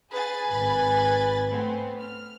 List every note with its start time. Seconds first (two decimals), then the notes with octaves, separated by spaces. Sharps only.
0.11 G#4 B4 G#5 A6
0.49 G#1 B5 A6
1.49 A3 B3 C4
2.00 F6